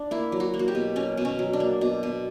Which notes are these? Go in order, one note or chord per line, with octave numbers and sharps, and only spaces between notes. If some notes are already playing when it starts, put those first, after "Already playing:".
Already playing: D4
A#3 E4
F#3
F#4
A#3
F#4
G4
B2
F#3 C#4
B2
C#4
F#3
D4
A#3
B2
B2